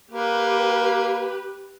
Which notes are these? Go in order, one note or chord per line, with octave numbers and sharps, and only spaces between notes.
A#3 G4 B4